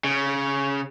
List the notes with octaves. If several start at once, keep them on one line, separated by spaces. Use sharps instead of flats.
C#3